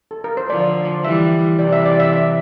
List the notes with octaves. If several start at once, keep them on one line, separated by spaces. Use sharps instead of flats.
A4
A#4
C5
D3 F3 D5
E3 G3 E5
C3 E3 D5
E5
D5
E5
E5